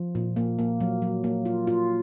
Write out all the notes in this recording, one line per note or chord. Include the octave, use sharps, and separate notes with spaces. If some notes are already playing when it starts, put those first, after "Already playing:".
Already playing: F3
A#2
A#3
A#3
F#3
F#3
A#3
F4
F4